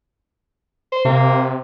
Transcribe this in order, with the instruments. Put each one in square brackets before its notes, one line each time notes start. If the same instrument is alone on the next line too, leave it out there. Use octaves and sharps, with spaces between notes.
[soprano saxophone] C5
[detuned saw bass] C3 [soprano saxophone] A#3